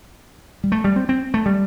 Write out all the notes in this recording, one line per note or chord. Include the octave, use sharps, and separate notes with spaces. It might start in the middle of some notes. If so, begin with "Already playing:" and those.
G3
A3
G3
C4
C4
A3
G3